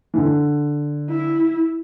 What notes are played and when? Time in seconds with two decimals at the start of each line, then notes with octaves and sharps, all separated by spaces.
0.14 E3
0.18 D3
1.10 E4